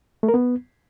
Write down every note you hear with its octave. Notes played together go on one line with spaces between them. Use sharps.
A3
A#4
B3